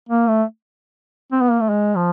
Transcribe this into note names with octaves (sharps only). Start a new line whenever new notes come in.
A#3
A3
C4
B3
A#3
A3
G#3
F3